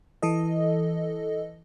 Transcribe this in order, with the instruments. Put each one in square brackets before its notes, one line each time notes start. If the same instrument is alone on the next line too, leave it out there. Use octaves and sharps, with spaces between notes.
[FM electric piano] E3 A4 D#5